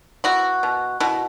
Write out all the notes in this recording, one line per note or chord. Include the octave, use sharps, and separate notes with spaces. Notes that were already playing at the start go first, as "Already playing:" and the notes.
B3 E4 F#4
B2
B2 E4 F#4